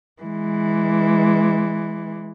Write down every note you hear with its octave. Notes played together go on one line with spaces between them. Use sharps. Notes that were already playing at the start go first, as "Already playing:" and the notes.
E3 G#3